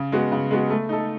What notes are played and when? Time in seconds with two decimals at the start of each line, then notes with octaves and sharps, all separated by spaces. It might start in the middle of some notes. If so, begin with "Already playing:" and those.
Already playing: C#3
0.12 G#3 B3 F#4
0.32 C#3
0.51 G#3 B3 F#4
0.70 A3
0.89 D#4 A4